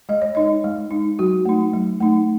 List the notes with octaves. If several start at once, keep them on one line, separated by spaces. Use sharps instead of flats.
G#3 D#5
C#5
D#4 D#5
G#3
D#4
F#3 F#4
A3 D#4
F#3
A3 D#4